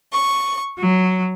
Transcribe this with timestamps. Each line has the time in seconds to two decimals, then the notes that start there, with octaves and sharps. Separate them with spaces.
0.12 C#6
0.78 F#3